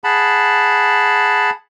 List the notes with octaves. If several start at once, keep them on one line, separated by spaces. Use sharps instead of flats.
G#4 F#5 A5 B5